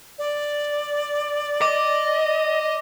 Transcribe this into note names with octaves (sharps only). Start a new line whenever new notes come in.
D5
D#5 D6